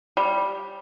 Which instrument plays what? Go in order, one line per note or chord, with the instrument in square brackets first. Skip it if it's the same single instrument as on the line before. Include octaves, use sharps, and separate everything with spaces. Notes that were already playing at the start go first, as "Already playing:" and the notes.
[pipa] G3